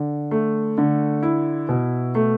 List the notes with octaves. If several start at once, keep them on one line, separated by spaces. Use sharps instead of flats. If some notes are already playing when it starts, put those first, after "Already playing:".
Already playing: D3
A3
D3
E4
B2
A3